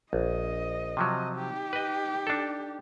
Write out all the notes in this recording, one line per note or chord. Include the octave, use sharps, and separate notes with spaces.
A#1 D#5
C3 F3 F#3
D#4 G4
B4 D#5
D4 A4